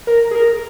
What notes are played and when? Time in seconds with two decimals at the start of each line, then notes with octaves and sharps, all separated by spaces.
0.07 A#4
0.31 G#4
0.35 A#4